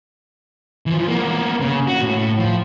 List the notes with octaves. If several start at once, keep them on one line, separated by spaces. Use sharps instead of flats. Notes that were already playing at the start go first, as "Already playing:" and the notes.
E3 F3
A#3 B3
C#3
F#4
A2
F3